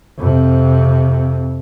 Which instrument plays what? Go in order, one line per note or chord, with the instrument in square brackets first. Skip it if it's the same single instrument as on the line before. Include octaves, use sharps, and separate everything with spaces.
[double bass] F2 C3